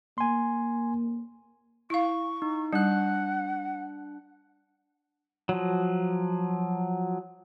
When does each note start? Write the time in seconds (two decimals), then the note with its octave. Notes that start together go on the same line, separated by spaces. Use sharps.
0.18 A#3 G#5 C6
1.90 E4 F5 C#6
2.42 D#4
2.73 G3 D4 F#5 F#6
5.49 F3 F#3